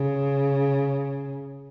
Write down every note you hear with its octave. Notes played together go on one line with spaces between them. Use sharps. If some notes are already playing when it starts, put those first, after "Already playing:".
Already playing: C#3